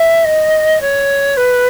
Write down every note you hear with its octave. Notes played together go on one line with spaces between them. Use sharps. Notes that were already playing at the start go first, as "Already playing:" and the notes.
Already playing: E5
D#5
C#5
B4